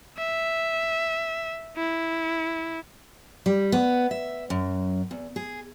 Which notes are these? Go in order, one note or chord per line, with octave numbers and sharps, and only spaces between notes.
E5
E4
G3
B3
E5
F#2
E2
G#4